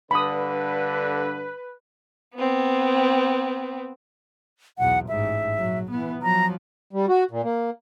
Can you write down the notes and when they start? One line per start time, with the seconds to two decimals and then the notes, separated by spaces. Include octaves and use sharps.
0.11 G2 D3 B4 B5 D#6
2.36 B3 C4
4.78 B1 E2 F#5
5.09 A1 G#2 E5
5.57 A#1 F#3
5.91 E3 B3
6.22 F3 F#3 A#5
6.93 G3
7.09 F#4
7.31 A#2
7.44 A#3